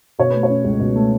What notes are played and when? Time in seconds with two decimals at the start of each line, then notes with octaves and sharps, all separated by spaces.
0.19 B2 C#5
0.30 A3 B4
0.43 C#5
0.50 C#4
0.64 C#2
0.80 B2
0.96 A3